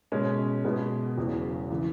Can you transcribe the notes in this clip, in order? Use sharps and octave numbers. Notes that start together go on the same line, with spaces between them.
B2 G#3 C#4
B2 G#3 B3
E1 E2 C#3 F#3
C#3 E3